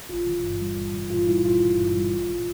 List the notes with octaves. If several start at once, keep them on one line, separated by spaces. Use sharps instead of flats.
G1 F4
E3
G2
G3
G1
E3
G2 F4
G3 E4
G1 F4
E3
G2
G3
A1
E3